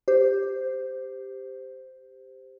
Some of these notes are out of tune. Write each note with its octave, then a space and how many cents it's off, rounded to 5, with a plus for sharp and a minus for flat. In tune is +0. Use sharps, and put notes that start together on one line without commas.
G4 +5 C5 -10